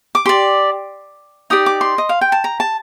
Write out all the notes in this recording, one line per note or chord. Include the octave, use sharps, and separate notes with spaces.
D6
G4 D5 C6
D#4 G4 D5 D#6
D6
C6
D#5
F5
G5
A5
A#5
A5